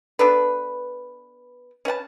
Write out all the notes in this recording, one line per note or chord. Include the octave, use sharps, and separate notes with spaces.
B3 D4 A4 B4
C#4 B4 F#5 A5